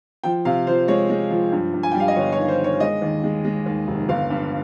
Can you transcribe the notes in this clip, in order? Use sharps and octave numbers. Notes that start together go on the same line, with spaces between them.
F3 G5
C3 F5
F3 C5
G#3 C#5
G#3
F3
G2
G2
G#5
G3 G5
F5
D#5
G1 C#5
C#5
D#3
C5
D#3
C#5
G#3 D#5
D#2
G#3
G#3
D#2
F1
G1 F5
G2